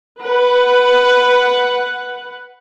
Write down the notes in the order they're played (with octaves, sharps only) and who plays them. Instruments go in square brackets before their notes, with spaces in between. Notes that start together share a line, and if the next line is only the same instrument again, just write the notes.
[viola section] B4 F#5